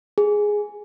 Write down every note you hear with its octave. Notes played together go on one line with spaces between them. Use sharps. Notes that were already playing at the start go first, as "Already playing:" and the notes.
G#4